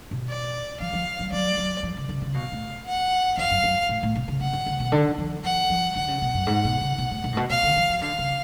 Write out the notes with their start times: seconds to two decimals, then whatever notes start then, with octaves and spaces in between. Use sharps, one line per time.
0.11 B2
0.29 D5
0.80 F3 F5
0.93 F3
1.19 F#3
1.32 F#3 D5
1.57 F#3
1.83 F3
1.97 C#3
2.09 C#3
2.22 C#3
2.34 B2 F5
2.52 A2
2.86 F#5
3.37 F2 F5
3.51 F#2
3.64 F#2
3.89 A2
4.03 A2
4.15 B2
4.28 C#3
4.41 C#3 F#5
4.53 D3
4.66 C#3
4.80 B2
4.92 D3
5.18 F3
5.44 F3 F#5
5.70 F3
5.96 D3 F#5
6.08 C#3
6.22 B2
6.34 F#2
6.47 G#2
6.65 B2
6.81 C#3
6.98 B2
7.11 A2
7.24 B2
7.33 A2
7.37 B2
7.50 B2 F5
7.63 D3
7.76 F3
7.89 F3
8.01 D3 F5
8.19 C#3